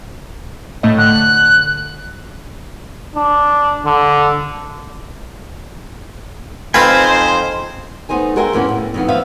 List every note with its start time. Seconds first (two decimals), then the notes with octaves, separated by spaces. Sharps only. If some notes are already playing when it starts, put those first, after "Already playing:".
0.83 A2 A3 D#5
0.98 D3 F#6
3.16 D4
3.86 D3
6.74 F2 C4 D#4 B4 C5 F5 G#5
8.09 A3 B3 D#4 C5 G#5
8.36 F#4 G#4 A#4 C5 E5 G5
8.53 F2 A2 A#3 B3 C#4
8.69 A2
8.94 F2 D#3 B3
9.08 D2 F3 B3 B4 E5 F5